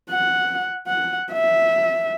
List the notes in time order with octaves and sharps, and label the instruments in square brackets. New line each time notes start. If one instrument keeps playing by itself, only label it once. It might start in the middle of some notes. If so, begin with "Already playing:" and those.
[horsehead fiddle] F#5
F#5
E5